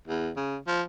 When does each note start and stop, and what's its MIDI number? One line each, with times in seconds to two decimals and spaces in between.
0.07 0.30 40
0.36 0.57 49
0.67 0.82 53